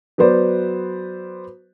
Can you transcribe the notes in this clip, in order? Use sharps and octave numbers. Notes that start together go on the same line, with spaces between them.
F#3 B3 B4 C5 D5